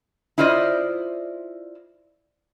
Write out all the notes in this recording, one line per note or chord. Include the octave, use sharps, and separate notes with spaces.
E4 F4 C5 D5 D#5